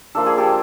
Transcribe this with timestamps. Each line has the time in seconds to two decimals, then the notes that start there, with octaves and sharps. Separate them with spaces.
0.15 F3 A#3 D4 A4
0.26 G#4
0.38 G4 A4